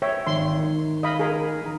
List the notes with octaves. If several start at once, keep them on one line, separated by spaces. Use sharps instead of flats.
C#5 E5 G5
G#1 C6
D#3
D#5 F5 B5
G#4 A#4
D#3 A#5